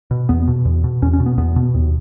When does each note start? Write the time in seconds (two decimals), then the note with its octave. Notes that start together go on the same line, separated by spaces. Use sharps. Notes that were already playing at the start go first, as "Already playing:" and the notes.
0.11 B2
0.29 E2 B3
0.47 B2
0.65 E2
0.84 B2
1.02 E2 C#4
1.13 C#4
1.20 B2
1.26 B3
1.38 E2 B3
1.56 B2
1.74 D#2